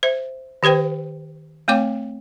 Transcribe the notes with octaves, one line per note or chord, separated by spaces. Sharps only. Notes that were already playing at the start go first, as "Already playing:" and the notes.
C5 E5
D#3 G4 B4 C5 G5
A3 C4 C#5 G5 D6